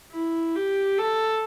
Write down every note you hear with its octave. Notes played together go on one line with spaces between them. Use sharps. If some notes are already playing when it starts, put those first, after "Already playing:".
E4
G4
A4